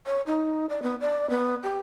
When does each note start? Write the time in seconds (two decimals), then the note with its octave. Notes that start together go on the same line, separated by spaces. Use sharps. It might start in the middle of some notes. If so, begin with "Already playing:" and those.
0.06 C#5
0.27 D#4
0.69 D5
0.82 B3
1.01 D5
1.30 B3
1.63 G4